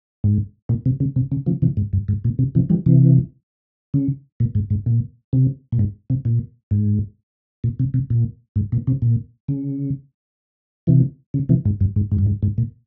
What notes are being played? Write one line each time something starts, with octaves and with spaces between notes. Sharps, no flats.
G#2
A#2
C3
C#3
C3
C#3
C#3 F3
C3 E3
G#2
G2
G#2
A#2
C3
C3 E3
E3 G3
C3 E3
C#3
A#2
G#2
G#2
A#2
C3
A#2
G#2
C3
A#2
G#2
A#2
C3
C3
A#2
G#2
A#2
C3
A#2
C#3
C3 E3
C#3
C3 E3
G#2
G2
G#2
G#2
G2
G#2
G#2
A#2